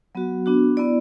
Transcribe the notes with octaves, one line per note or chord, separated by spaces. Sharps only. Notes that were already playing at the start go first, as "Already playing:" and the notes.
F#3 B3 F#4
B3 D4 F#4
B3 E4 D5